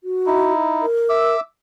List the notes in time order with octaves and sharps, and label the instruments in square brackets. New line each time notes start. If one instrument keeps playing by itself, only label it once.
[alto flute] F#4
[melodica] D#4 E4
[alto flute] A#4
[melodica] E5 D6 E6